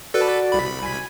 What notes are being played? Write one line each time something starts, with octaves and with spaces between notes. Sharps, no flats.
F#4 A4 B4 D5
C2 B5
G#5